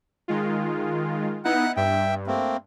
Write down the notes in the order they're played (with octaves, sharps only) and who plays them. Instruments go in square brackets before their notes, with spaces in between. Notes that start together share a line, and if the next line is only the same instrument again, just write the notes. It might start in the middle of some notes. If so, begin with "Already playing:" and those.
[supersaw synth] D#3 G#3 F4
[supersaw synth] B3 D#4 E4 [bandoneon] F#5 F#6
[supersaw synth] G2 [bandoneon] E5 G5
[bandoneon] A3 A#3 C4